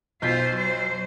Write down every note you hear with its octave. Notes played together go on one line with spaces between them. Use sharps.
B1 F4 C5 G6 B6
F#3 C5